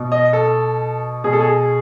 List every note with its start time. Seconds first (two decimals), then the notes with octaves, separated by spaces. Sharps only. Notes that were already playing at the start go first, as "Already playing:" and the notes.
Already playing: B2
0.12 D#5
0.33 A4
1.24 B2 G#4
1.33 A4
1.40 G#4